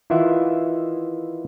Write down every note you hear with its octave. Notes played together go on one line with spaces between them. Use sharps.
D#3 E3 E4 F4 E5 F#5